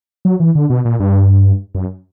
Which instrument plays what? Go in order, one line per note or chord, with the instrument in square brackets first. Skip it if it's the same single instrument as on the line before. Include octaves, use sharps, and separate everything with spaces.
[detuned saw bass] F#3
E3
D3
B2
A#2
G2
F#2